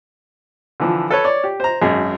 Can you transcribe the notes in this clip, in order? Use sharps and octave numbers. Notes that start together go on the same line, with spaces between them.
D3 E3 F3
A4 B4 C#5
C#5 D5
G4
C5 A#5
G#1 F#2 G#4